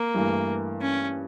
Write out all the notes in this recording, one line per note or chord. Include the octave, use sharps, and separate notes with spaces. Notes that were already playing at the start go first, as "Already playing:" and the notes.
Already playing: A#3
G2 E3 A3
C#4